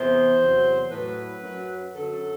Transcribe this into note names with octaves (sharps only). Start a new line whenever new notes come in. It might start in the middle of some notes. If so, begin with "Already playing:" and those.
Already playing: E2 C3 E3 C5
E2 C3 F#3
A2 F#3 B4
F#2 F#3
F#2 D3 F#3 A4